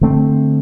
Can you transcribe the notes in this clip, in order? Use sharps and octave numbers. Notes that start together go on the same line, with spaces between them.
D3 A3 C4